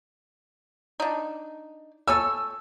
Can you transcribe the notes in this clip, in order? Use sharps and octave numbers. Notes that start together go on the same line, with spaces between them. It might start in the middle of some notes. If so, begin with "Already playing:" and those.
D4 D#4
A4 C#5 G#5 E6